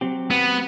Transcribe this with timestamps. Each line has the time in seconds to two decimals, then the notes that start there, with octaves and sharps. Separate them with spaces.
0.01 F#3 C4 G4
0.31 B3